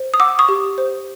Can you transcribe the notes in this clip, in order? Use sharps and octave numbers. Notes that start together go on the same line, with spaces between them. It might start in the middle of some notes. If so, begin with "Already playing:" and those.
Already playing: C5
D#6
F#5 D6 E6
C#6 D#6
G4
C5